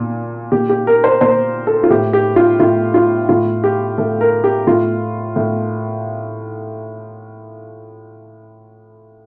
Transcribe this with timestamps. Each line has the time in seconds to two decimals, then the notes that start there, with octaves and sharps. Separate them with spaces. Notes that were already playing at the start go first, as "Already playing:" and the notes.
Already playing: A#2
0.52 A#2 G4
0.69 G4
0.87 A#4
1.04 C5
1.21 A#2 C5
1.67 A4
1.83 F4
1.90 A2 G4
2.13 G4
2.36 F4
2.59 A2 F4
2.94 F4
3.29 A2 F4
3.64 G4
3.98 A2 A4
4.21 A#4
4.44 G4
4.67 A2 F4
5.36 A2